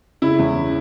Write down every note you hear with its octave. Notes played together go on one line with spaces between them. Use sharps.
C#3 E4
E2